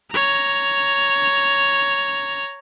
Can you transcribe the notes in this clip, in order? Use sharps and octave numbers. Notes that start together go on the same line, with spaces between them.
C#5 A#5